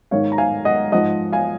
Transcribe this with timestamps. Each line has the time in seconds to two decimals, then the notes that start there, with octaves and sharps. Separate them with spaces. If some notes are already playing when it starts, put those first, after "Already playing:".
0.11 G#2 D#3 C#5 F5
0.32 A#5
0.38 F5 G#5
0.65 D#5 F#5
0.92 G#2 F3 D#5 F#5
1.32 F5 G#5